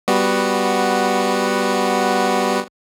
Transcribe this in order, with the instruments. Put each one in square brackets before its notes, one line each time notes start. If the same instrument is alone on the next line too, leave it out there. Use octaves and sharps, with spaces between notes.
[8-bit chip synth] G3 B3 F#4